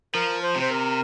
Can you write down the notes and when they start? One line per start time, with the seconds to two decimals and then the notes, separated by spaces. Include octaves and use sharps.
0.14 F3 A#4
0.42 C5
0.56 C3
0.61 C5
0.70 A#4